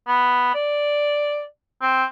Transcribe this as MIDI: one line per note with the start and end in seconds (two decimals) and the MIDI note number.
0.07 0.50 59
0.55 1.45 74
1.82 2.05 60